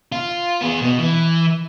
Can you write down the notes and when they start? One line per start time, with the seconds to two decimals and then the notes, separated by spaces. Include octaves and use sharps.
0.12 F4
0.61 B3 G#4
0.81 B2
0.99 E3